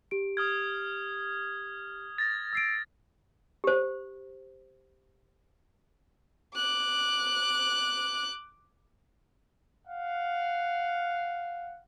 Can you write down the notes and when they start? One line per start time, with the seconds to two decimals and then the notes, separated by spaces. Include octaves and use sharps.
0.11 G4 D7
0.37 D#6 F6 G#6
2.18 A6 A#6
2.53 E6 C7 D7
3.64 G4 C5
6.56 D6 F#6
9.88 F5 F#5